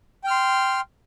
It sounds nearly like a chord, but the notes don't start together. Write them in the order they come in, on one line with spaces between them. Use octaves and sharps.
G5 F6 C6